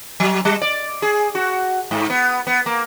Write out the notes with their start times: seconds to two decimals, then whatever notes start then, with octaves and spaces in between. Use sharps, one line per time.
0.20 F#3
0.45 G3
0.62 D5
1.02 G#4
1.35 F#4
1.91 G#2
2.10 B3
2.47 B3
2.66 A#3